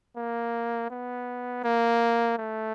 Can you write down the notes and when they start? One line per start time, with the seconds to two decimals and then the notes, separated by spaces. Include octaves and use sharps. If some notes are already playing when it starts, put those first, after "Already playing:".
0.16 A#3
0.90 B3
1.64 A#3
2.38 A3